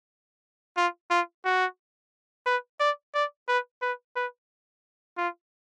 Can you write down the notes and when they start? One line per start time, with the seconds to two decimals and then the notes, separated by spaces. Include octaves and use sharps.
0.77 F4
1.10 F4
1.45 F#4
2.46 B4
2.80 D5
3.14 D5
3.48 B4
3.82 B4
4.16 B4
5.18 F4